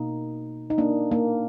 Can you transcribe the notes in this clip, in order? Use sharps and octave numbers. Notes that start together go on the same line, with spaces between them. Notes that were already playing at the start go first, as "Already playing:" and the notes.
Already playing: B2 A#3 D#4
D#4
A#3 D4
A#3